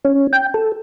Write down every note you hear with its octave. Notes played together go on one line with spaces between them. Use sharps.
C#4
G5
A4